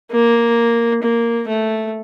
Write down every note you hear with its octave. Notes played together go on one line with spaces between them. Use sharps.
A#3
A#3
A3